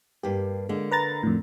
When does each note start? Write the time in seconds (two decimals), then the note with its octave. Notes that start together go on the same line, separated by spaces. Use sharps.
0.23 G2 A#3 G4
0.69 D3 G#3 A#3
0.91 B4 A#5 A6
1.23 F2 A2